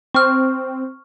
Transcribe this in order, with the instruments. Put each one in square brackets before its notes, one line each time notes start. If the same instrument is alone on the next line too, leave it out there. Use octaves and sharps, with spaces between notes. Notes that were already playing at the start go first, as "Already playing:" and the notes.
[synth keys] C4 [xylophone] C#6 F6